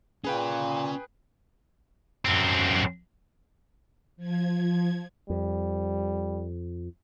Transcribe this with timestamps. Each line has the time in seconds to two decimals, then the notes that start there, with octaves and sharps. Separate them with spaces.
0.24 A#2 C#4 G#4 B4 F5 G5
2.25 F#2 C4
4.17 F3 G#6
5.30 F2 G3